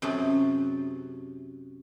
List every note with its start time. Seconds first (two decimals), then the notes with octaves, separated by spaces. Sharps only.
0.02 F#2 C3 C#4 G#4 A5